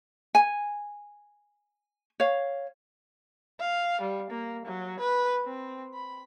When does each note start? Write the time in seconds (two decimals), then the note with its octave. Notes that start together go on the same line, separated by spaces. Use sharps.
0.35 G#5
2.20 C#5 F5
3.60 F5
4.01 G3
4.31 A#3
4.66 F#3
5.00 B4
5.45 C4
5.94 B5